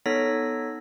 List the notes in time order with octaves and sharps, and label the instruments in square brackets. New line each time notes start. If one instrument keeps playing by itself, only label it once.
[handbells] B3 D#4 A4 C#5 A#6 B6